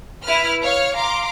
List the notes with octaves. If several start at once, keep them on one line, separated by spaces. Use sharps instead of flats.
E4 B4 F6
C#5 F5 F6
F5 A#5 C6 D6